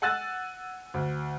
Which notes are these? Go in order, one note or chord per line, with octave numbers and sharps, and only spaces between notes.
F#5 G#5 E6 F#6 A6
D2